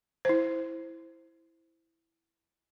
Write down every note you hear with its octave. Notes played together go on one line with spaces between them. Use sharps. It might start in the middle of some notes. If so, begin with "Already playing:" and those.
E4 C5